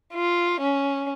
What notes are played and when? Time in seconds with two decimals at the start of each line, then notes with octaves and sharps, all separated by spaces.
0.14 F4
0.61 C#4